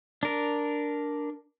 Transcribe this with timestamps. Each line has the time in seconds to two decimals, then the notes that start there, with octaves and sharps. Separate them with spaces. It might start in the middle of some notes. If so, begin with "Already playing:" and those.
0.23 D4 A#4